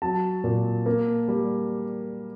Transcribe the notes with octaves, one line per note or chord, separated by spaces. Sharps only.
F#3 A5
A#2
A#3
G3